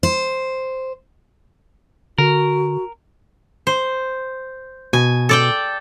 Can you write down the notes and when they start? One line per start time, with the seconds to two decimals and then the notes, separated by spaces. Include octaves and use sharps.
0.03 C5
2.18 D3 F#4 A#4
3.67 C5
4.93 B2 G#5
5.29 A4 D5 G5